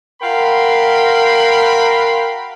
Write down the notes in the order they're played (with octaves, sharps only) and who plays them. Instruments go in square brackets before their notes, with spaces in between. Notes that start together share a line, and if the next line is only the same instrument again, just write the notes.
[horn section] F#4 A#4 F5 G5 B5 C6